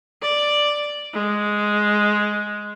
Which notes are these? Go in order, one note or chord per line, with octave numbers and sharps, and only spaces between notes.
D5
G#3